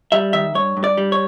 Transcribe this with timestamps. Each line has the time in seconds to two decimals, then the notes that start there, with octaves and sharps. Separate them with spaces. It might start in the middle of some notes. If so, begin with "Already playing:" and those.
0.12 G3 E5
0.33 D#3 E5
0.55 G2 C#5
0.77 G2
0.84 D5
0.97 G3
1.12 C#5